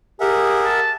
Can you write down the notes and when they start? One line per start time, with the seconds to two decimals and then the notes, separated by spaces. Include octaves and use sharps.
0.21 G4 G#4 A#4 E5 F#5
0.63 A5